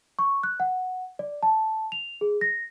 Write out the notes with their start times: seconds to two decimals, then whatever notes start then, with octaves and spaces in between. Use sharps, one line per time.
0.19 C#6
0.43 F#6
0.60 F#5
1.19 D5
1.43 A5
1.92 F7
2.21 G#4
2.41 A#6